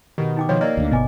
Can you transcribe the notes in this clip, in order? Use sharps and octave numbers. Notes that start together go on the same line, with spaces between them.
B2 D#3 G4
D#4 G5 D6
B2 D#3 F3 C#5 G5 C#6
A#3 A#4 D5 D#5
D2 D3
G1 B2 B3 D#5 G#5 D6